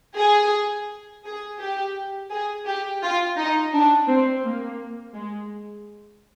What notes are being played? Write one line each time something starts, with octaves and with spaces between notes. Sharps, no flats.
G#4
G#4
G4
G#4
G4
F4
D#4
D4
C4
A#3
G#3